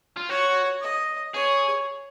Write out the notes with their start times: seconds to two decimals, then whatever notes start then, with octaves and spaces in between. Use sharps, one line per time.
0.17 F4
0.29 F#4 C#5
0.81 D#5
1.34 G#4 C#5